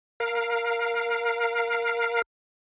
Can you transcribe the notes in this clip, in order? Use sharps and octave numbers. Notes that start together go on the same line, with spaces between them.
A#4 F5